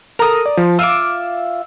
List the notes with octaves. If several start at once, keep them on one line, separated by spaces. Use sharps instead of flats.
A4 A#4 A#5 D#6
D5
F3
F4 E5 D6 E6